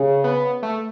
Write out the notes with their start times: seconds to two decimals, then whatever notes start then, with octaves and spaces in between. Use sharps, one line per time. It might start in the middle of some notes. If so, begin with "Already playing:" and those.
Already playing: C#3
0.24 B3
0.63 A3